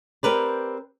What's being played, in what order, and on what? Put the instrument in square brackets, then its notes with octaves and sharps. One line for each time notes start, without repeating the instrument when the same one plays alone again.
[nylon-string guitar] C4 G4 A#4 B4 D5